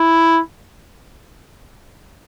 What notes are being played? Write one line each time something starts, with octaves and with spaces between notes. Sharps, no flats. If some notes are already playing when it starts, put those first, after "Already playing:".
Already playing: E4